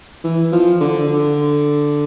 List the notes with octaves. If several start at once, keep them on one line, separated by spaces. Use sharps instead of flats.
E3
F3
D3
D3